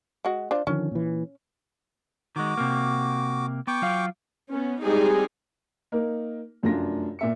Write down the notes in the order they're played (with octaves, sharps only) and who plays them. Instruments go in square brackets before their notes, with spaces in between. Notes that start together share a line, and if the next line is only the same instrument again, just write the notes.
[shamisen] G#3 F#4
D4 F4 C5
[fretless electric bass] D3 D#3 F3 [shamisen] C#4
[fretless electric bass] A#2 E3
[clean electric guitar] D#3 G#3 [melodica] F#4 D6
[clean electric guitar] C3 A#3
[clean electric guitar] B3 [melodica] G5 C#6 D6
[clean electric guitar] F#3 F4 F5
[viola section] B3 C#4
G3 G#3 C4 D#4 G4 G#4
[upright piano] A#3 D#4 A#4
F1 F#2 A3 D4 F4 A#6
A#2 E5 C#7